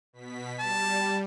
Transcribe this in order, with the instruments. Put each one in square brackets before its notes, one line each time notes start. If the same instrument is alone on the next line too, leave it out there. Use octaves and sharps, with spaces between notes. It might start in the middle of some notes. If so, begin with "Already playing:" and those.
[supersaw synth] B2 B6
[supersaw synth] G3 [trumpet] A5